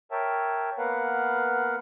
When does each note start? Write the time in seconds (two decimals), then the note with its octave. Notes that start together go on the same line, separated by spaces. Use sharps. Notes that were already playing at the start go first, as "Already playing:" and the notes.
0.12 A#4 C#5 E5 G5 A5
0.78 A#3 B3 A#4 B4 F5 F#5